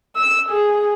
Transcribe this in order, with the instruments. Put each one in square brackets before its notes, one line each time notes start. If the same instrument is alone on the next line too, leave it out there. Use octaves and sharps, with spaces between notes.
[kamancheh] E6
G#4